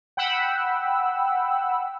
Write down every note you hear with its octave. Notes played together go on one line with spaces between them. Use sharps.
F#5 G5 B5 E6